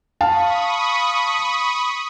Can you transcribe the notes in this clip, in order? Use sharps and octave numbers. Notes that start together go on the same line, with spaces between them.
F5 A5 B5 C#6 D#6